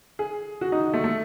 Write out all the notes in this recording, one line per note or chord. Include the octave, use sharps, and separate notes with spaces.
G#4
F#4
D#4
A3
A3